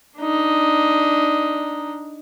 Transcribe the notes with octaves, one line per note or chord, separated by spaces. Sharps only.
D4 D#4